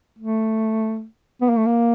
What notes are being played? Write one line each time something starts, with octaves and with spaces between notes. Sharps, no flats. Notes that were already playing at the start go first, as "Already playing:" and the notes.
A3
B3
A#3
A3
A#3